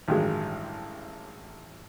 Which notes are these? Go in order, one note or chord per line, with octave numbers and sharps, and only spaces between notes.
A1 G2 D#3 F#3 G#3